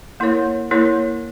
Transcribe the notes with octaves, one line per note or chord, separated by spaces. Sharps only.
A#3 E4 A#4 C#5
A#3 E4 A#4 C#5